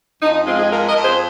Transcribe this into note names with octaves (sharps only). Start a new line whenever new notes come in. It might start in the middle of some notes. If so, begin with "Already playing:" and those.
F2 D#4
D#4
G#3 C4 F4
D#4 G#4
F2 F4 A#4
A#4 D#5
F2
G#4 C5